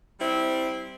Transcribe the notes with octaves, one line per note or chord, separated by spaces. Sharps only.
G3 C4 E4